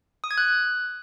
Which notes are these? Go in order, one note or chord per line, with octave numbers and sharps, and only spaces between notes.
D#6
G#6
F#6